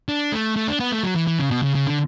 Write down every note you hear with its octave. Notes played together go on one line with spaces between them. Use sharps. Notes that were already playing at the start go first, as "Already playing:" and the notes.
D4
A3
A3
D4
B3
A3
F#3
E3
E3
C#3
B2
C#3
C#3
D3